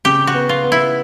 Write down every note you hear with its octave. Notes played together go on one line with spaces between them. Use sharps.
C#3 G4
F#4
B3
F4
B3
E4